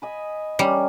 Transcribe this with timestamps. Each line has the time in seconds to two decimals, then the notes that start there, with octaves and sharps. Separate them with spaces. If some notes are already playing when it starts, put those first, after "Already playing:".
0.02 D#5 G#5 B5
0.59 G3 C#4 A#4